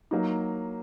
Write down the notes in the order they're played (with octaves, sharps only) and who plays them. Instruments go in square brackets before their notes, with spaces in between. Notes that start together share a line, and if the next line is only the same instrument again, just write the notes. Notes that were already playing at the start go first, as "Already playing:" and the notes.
[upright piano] F#3 A#3 D#4